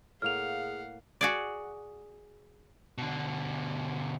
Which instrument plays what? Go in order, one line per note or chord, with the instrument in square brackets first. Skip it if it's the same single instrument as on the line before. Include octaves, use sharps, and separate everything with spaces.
[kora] A2 A#3 [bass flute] G#4 [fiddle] F5 F#5 [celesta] F6 F7
[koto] F#4 G#4 D5
[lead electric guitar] B2 D3